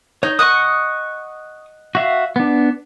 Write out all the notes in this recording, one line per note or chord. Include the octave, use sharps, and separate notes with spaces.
D#4 C#5
D#5 F#5 C#6 D#6
F#4 E5 F5
B3 D4